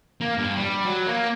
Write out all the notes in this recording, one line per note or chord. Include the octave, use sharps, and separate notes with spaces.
A#3
G2
G3
F#3
A#3